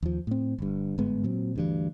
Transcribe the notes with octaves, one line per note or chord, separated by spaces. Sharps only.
D#2 F3
A2 C4
G1 G2
G1 G#2 G#3 B3
A#2 F#3 C4
D2 G2 E3